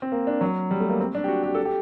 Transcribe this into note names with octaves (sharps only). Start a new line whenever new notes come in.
C4
A#3
D4
F#3
G3
A3
A#3
C4
D4
G4
F#4
G4
A4
G4